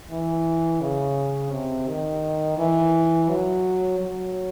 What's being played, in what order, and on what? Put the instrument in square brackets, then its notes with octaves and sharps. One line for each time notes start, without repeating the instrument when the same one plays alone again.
[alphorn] E3
C#3
C3
D#3
E3
F#3
F#3